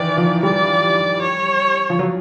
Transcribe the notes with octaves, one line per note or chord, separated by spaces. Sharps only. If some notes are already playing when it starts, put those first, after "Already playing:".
Already playing: D#3 E3 D5
F3
G3 D5
C#5
F3
F#3